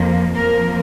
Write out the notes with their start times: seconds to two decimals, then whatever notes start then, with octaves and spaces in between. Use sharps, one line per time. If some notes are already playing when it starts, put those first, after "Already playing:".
Already playing: F2 F3 A#3
0.36 F2 F3 A#3 A#4